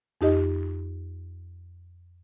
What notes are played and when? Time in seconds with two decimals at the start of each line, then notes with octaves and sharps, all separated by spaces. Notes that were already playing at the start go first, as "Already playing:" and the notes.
0.21 F2 D#4 G4 D#5